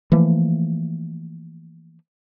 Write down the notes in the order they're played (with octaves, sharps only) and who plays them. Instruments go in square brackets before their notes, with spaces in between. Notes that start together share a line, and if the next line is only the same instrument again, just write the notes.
[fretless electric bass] E3 F3 A3 A#3